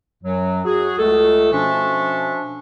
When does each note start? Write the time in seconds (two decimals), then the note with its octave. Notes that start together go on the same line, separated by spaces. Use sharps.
0.22 F#2 F#3
0.65 F#4 G#4
0.98 C#2 A3 A4
1.52 B2 F3 C#4 D4 E5 C#6